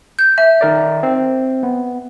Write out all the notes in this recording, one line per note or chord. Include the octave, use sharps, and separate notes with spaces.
G6
E5
D#3 A#4 D5
C4 C5
B3